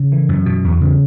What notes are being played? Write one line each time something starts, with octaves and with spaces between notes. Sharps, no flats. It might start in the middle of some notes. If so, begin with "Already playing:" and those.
Already playing: C#3
E3
F#2
B2
E2
C#3